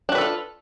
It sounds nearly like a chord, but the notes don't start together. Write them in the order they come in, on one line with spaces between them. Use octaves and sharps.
D4 F#4 B4 A4 F4